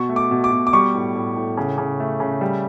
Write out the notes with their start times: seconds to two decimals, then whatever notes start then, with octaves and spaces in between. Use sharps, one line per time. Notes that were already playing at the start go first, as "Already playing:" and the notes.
Already playing: B2 C#6
0.09 A3
0.16 D6
0.31 B2
0.44 D6
0.52 B2
0.67 D6
0.73 G3 C#6
0.94 A2
1.15 A2
1.36 A2
1.57 C#3
1.78 C#3
2.00 A3
2.20 C#3
2.41 G3